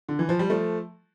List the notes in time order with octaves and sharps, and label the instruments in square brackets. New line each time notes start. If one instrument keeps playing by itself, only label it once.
[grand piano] D3
E3
F3
G3
F3 A3